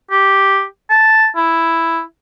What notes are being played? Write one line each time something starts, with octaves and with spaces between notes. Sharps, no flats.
G4
A5
E4